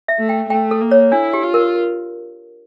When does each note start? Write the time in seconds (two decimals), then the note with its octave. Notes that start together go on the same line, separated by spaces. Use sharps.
0.08 E5
0.19 A3
0.29 G5
0.50 A3 G5
0.71 A4
0.81 A#3
0.91 C#5
1.12 D4 E4
1.33 G4
1.43 F4
1.54 A#4